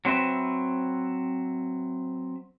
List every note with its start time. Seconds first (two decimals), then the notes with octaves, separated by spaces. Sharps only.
0.05 F#3 C4 B4 E5